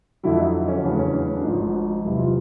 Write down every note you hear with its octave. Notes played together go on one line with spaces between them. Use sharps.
F2 D3 F#3 E4
D#4
C#4
E2 C#3 F#3 A3 D4
C#4
D4
D4
G#1 G#2 F3 D#4
F#1 E2 C3 E4
F4